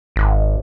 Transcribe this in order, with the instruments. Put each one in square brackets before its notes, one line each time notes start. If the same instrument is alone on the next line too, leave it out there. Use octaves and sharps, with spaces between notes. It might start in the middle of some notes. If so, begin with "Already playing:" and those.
[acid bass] G#1